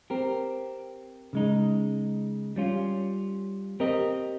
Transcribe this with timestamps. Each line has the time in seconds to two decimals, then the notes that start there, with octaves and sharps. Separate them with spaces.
0.10 C4 G4 A#4
1.33 C#3 G#3 D#4
2.56 G3 C#4 F4
3.80 C4 G4 A#4 D#5